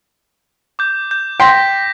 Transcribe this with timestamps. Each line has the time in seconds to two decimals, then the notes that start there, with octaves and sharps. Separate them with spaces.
0.79 D6 G6
1.11 G6
1.40 G5 C6 A#6 B6